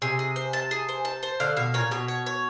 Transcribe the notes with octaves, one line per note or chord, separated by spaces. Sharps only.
C3 G#4
G#4
C5
A5
G#4
C5
A5
C5
D3 F5
B2 F5
A#2 C#5
B2 C#5
C#5
C#5